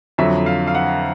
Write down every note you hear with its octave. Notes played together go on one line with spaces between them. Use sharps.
F2 D3 F#3 E5
F5
F5
F#5